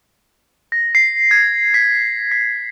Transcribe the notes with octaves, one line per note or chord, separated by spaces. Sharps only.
A#6
C7
G#6
B6
B6